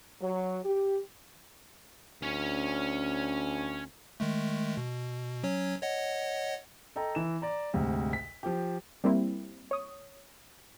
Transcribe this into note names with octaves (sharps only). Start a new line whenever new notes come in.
F#3
G4
D2 C#4 C#5
D#3 G#3 A3
B2
F#3 C#4 C#5
C#5 D#5 F#5
A4 D#5 G5 A#5
E3 E7
D5 A#5
D2 G#2 C3
B6
F3 G4
G3 A#3 C4 E4
C#5 D#6